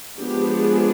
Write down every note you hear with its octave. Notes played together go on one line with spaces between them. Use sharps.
F3 G#3 B3 D4 G4
G#4